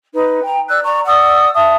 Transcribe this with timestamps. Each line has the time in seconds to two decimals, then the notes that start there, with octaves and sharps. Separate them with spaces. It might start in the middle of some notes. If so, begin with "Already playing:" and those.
0.13 D#4 B4
0.43 G5 A#5
0.68 D5 E6 F#6
0.83 D5 A#5 C#6
1.05 D5 F#5 D#6 E6
1.54 E5 A5 D#6